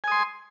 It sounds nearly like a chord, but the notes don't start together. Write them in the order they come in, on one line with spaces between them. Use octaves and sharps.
G#5 D#6 C6